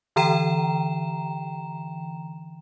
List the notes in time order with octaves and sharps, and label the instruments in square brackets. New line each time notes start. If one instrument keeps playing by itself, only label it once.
[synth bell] D3 E3 G5 A#5 E7